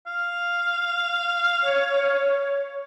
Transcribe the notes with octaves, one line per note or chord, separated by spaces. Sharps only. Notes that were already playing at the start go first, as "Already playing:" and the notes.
F5
C#5